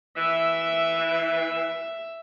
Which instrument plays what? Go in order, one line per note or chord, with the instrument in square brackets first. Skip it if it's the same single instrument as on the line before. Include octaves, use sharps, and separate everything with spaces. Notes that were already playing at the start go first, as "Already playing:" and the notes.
[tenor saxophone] E3 [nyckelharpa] E5